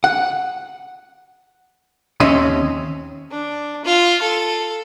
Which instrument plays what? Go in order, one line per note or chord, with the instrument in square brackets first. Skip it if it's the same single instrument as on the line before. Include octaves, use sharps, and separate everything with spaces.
[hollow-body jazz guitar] F#5
D#2 C4 C#4 D#5 E5 C6
[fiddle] D4
F4
A4